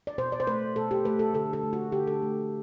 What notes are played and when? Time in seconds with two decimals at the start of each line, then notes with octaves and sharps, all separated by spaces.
0.07 D5
0.18 B2 C5
0.32 D5
0.40 C5
0.47 A3 B4
0.76 B2 A4
0.91 G4
1.05 A3 B4
1.19 A4
1.34 D3 A4
1.53 A4
1.63 A3
1.73 F#4
1.92 D3 G4
2.07 A4
2.22 A3